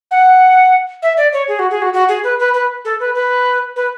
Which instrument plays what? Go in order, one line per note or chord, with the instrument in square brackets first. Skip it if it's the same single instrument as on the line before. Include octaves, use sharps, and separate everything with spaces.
[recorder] F#5
E5
D5
C#5
G#4
F#4
G#4
F#4
F#4
G#4
B4
B4
B4
A4
B4
B4
B4